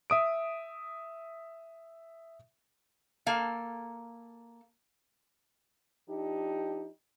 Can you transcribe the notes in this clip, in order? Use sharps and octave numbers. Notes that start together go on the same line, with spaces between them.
E5 D#6 D7
A#3 A4 F5
F3 D4 D#4 G4